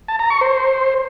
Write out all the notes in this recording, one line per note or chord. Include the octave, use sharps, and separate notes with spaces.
A5
A#5
C#6
C5